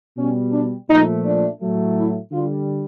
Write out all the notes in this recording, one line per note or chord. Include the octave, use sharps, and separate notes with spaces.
B2 G3 C#4
D4
A#2 F3 A3 D#4
D4
A2 F#3 A3
E4
D3 G3 F4